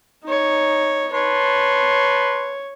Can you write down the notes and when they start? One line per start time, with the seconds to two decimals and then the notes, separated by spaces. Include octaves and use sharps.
0.24 D#4 C#5
1.13 B4 C#5 A5 C6